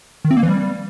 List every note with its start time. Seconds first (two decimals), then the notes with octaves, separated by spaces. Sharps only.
0.25 D#3
0.31 C4
0.37 A#3
0.43 E3
0.49 G3